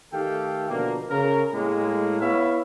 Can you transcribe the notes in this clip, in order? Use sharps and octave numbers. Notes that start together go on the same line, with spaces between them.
D#3 A3 G4 A4 F5 G5
B2 D3 F3 A#3
C#3 A#4
A2 G#3 A#3
B3 E4 C#5 E5 F5